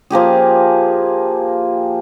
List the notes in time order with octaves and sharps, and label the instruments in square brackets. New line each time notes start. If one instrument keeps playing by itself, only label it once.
[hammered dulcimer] F3 A#3 G4 G#4